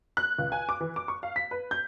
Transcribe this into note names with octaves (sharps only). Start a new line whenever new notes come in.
F#6
C#2
G#5
D6
E3
D6
C#6
F5
B6
B4
G6